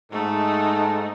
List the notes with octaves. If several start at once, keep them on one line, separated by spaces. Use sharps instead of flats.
G#2 A3 D#4 A4